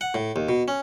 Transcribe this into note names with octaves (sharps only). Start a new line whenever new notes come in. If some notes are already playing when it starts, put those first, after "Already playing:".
F#5
A2
D#2
B2
C#4